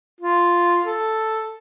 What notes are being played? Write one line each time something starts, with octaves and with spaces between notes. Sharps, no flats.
F4
A4